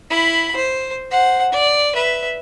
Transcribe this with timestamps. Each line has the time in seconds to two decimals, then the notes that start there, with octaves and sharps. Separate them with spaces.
0.10 E4 B5
0.56 C5
1.11 C5 F#5
1.52 D5
1.94 B4 E5